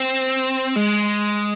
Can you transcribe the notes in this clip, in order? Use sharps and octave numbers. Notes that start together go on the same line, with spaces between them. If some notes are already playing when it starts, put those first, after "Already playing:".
Already playing: C4
G#3